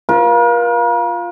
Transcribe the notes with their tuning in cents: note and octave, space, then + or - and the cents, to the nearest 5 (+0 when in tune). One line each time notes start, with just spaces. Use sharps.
F4 +0 A#4 +45